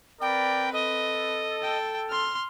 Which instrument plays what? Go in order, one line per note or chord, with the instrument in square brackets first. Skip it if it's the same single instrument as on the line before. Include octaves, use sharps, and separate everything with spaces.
[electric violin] C4 B4 [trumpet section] A#4 D5 B5 [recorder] G5
[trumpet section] A4 [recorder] D#5
[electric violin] G5 A5
C6 F6